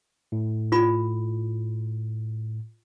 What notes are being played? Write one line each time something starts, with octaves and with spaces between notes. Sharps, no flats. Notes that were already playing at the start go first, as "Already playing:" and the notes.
A2
A2 F4 B5